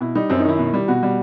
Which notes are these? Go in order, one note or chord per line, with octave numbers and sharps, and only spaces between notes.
B2 E4
G3 D#4
F#2 C4
D#4
D#3 E4
B2
G3
B2 F#4
G3